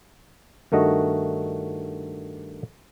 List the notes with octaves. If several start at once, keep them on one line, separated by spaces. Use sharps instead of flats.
G2 D#3 A3 F#4 D#5